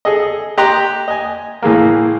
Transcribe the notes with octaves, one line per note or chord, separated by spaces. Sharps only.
G#4 A4 D#5
G4 D#5 G5 A#5 C6 F#6
D#5 G#5
A2 E3 G#3 A#3